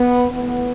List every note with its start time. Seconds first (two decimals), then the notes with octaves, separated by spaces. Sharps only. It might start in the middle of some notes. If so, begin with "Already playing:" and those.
Already playing: B3
0.31 A2 E3 B3